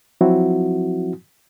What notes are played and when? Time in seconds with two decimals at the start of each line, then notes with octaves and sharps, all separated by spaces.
0.21 F3 F#3 C4 E4 F#4